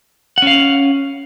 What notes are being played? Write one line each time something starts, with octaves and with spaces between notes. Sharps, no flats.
C#4 F5 F#5